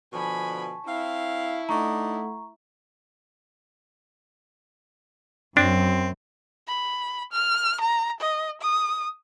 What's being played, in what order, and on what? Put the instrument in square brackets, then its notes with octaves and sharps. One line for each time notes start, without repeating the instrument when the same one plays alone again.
[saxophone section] B2 D3 F3 [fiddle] G#5 B5 [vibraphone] A5 C#6
[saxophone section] C4 F5 [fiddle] E4
[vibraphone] A3 A4 F#5 [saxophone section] D4 D#4 [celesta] A#5 C#6
[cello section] F#2 [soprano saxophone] C4 [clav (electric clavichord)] D4
[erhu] B5
F6
A#5
D#5
D#6